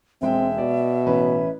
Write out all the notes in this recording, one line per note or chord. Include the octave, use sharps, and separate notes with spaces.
E1 G#3 C4 E5 G5
B2 D5
A1 C#4 B4